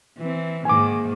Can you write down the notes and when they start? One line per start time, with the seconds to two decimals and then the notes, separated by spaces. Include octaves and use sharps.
0.18 E3 C4
0.65 G#2 D#3 A#3 G#5 D6